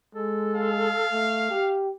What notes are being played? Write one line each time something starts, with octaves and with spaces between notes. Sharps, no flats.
G#3 A4
F5
A3
G4